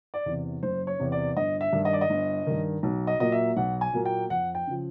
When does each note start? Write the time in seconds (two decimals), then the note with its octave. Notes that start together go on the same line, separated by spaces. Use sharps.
0.14 D5
0.26 E2 C3
0.63 F#1 C5
0.87 C#5
1.00 E2 C3
1.12 D5
1.37 G1 D#5
1.61 E5
1.73 G2 D#3
1.85 D#5
1.93 D5
2.01 D#5
2.10 G1
2.47 G2 D#3
2.83 B1
3.07 D#5
3.20 A#2 F#3 A#3 D#5
3.32 E5
3.57 B1 F#5
3.81 G#5
3.93 A#2 F#3 A#3
4.05 G5
4.30 F2 F#5
4.55 G5
4.67 C#3 F3